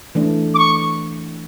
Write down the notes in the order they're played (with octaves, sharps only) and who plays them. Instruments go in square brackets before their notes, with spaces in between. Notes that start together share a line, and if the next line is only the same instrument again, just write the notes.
[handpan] E3 A3 D4
[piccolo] D6
C#6